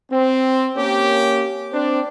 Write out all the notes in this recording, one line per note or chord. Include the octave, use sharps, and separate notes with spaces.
C4
A#3 C#4 G4
C4 D4